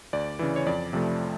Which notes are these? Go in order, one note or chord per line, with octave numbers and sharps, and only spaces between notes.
D2 D5
C#3 E3
C#5
F2 D5
C3 F3 A3